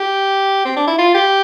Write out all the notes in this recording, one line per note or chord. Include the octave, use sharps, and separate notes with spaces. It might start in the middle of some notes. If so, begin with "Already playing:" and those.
Already playing: G4
C4
D4
E4
F4
G4